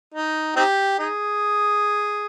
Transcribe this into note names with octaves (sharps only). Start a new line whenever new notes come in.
D#4
C4 D#4 G4
D#4 G#4